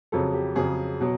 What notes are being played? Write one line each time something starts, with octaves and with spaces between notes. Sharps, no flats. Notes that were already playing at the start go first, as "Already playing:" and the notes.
F2 C#3 F#3 A4
G4
F2 C#3 F#3 G#4
B2 F#3